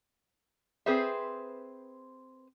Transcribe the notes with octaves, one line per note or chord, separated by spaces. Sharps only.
C4 G#4 B4 C5 E5